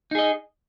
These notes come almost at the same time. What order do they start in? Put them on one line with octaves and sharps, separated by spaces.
D#4 G#4 D#5